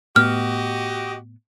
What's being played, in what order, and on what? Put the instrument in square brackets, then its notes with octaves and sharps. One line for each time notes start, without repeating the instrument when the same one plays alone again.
[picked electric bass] A2 B3 [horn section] F#4 G4 D#5 [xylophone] F6